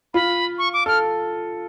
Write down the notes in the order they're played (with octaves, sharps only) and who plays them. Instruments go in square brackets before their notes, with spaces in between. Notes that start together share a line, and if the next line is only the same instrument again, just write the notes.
[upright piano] F4 [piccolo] B5
[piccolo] C#6
D6
[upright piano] A4 [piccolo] F6